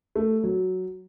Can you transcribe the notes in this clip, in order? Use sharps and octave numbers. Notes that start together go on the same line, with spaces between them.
A3
F#3